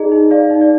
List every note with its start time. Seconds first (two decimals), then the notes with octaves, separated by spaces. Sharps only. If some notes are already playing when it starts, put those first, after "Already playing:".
Already playing: D#4 G#4 D5 D#5 A#5
0.12 D#4
0.31 D5 F5
0.50 D#4
0.61 D5